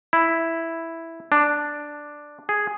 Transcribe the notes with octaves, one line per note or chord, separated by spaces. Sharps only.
E4
D4
G#4